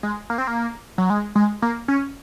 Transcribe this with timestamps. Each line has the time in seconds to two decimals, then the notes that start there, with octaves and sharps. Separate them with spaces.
0.03 G#3
0.30 A#3
0.38 C4
0.47 A#3
0.98 F#3
1.10 G#3
1.35 G#3
1.62 A#3
1.88 C#4